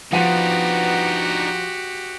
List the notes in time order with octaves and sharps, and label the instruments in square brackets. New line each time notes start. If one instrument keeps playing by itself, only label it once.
[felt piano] F3 F#5 D#7 [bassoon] B3 [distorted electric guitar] D4 D#4 [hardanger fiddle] F#4 G4